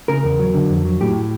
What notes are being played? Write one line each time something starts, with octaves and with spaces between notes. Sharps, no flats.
C#3 A#4
E2
F#3
D3
F2
F#3
A2 G4